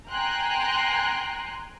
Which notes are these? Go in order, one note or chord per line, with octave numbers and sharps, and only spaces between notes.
G5 G#5 A#5 C6 F#6